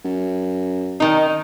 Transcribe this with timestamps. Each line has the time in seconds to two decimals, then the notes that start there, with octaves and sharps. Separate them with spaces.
0.05 F#2
1.00 D#3 D#4